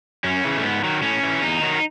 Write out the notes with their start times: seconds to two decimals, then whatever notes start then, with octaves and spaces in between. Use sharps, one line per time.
0.24 F#2 C#4
0.44 C#3 E3
0.57 A3
0.63 G#2 B3
0.84 D#3 F#3
1.03 A2 C#4
1.23 E3
1.42 E2 D#4
1.61 D#3 F#3